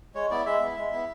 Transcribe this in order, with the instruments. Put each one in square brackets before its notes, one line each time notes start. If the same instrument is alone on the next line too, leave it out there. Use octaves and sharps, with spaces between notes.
[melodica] G#3 C#5
B3 E4 D5
G#3 E5
B3 E4
G#3
B3 E4